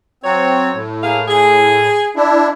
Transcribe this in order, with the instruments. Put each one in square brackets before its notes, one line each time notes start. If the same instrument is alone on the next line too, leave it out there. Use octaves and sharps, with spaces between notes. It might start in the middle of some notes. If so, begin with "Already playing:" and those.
[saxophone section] F#3 C#5 [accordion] C4
[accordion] A2
[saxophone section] A#3 G#4 F5
G#4
[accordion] D4 E4